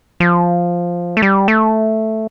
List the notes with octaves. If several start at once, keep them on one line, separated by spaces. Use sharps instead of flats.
F3
A3
G3
A3